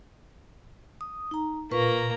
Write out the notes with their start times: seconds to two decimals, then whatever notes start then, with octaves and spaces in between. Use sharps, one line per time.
1.01 D#6
1.31 D#4 A#5
1.71 A#2 A#3 F4 B4 A#5 C#6